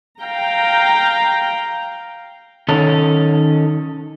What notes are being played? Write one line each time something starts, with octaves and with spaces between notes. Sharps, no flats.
F5 G5 A#5
D#3 C#4 A4